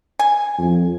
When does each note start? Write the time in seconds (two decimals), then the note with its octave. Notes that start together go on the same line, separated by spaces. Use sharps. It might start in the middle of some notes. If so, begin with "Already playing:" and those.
0.19 G#5
0.58 F2